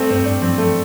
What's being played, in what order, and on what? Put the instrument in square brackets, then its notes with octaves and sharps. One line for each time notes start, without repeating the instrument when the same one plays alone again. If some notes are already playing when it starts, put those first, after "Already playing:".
Already playing: [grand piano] G3 A3 C4
[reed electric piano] G2 [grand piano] C4
[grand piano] D4
[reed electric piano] F3 [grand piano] C4
[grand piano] A3